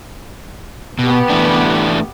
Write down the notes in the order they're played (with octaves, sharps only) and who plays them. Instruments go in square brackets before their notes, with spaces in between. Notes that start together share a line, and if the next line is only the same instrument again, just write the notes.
[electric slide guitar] B2 [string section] B3 G4
[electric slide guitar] E3 A3 D4